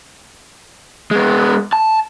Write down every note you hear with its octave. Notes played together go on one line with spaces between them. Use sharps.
G#3 B3
A5